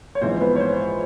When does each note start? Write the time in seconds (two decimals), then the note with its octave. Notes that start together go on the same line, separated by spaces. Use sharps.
0.15 C#5
0.21 A#1 G#2 E3 G#3 C4 C5
0.40 B3 B4
0.56 C#5
0.60 C4 C5